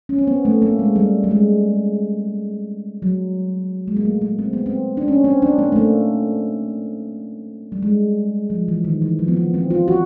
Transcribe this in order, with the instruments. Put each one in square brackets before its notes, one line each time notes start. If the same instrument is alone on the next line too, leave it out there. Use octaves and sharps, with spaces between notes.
[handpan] C#4
C4
B3
A3
A#3
G#3
G3
G3
G#3
F#3
G#3
A#3
A3
A#3
C4
B3
C4
D4
C#4
C4
D4
A#3
A3
A#3
G3
G#3
F3
E3
D#3
E3
F3
B3
A#3
C4
F4
F#4